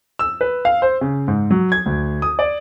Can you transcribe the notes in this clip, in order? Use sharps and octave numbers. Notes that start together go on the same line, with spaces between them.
E6
B4
F5
C5
C#3
G#2
F#3
G#6
D2
D#6
D5